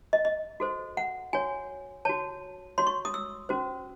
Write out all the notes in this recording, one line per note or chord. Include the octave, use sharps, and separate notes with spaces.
D#5
D#5
F#4 A4 C5
F#5
F#4 C#5 G#5
F#4 C#5 A5
F#4 C#5 C6
C#6
D#6
E6
C#4 F#4 C5